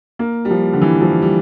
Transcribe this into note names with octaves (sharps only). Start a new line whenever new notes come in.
A#3
G3
F3
D3
E3
F3
G3